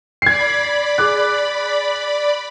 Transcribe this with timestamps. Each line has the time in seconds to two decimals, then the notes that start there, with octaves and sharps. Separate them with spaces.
0.22 D5 B5 G#6 C7
0.98 G#4 D6 F#6